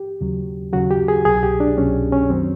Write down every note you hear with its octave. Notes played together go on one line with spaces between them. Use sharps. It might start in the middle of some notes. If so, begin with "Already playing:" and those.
Already playing: G4
D#2 C#3 F#3
D#2 C#3 F#3 F#4
G4
G#4
C2 B2 F#3 G#4
G4
D4
C2 B2 F#3 C#4
C#4
F#2 D#3 F#3 C4